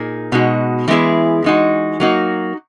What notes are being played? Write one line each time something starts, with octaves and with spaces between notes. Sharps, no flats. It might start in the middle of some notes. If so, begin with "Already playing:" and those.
Already playing: A#2 A#3 D#4 G#4
B2 G#3 D#4 F#4
E3 G#3 B3 E4 G#4
E3 G#3 D#4 F#4
F#3 A#3 D#4 F#4